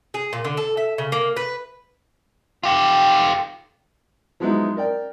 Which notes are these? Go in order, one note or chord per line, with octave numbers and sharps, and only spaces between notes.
G#4
A#2
D3
A4
E5
C#3
A#3
B4
F4 G4
F3 F#3 G#3 B3 D#4 E4
A#4 D5 G5